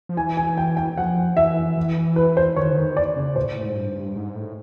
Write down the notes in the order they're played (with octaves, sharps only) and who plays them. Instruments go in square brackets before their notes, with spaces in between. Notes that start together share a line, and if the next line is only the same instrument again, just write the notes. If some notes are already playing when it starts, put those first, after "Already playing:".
[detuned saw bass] F3
[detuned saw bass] E3 [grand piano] G#5
[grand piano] G#5
G5
G5
[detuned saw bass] F3 [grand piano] F#5
[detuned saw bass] E3 [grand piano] E5
[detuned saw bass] E3
[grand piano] B4
C5
[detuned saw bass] D#3 [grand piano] C#5
[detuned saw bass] D3
D#3
[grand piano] D5
[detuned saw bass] C#3
[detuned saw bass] A2 [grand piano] C5
[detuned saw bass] G#2
G2
G#2
A2